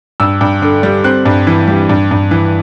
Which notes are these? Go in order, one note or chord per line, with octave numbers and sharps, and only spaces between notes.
G2 E6
G2
D3
G3
C4 F#6
G2
E3
G3
G2
G2
E3